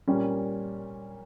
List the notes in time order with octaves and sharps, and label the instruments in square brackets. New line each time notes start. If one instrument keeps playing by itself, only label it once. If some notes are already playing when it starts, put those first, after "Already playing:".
[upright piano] A#2 G3 A#3 C#4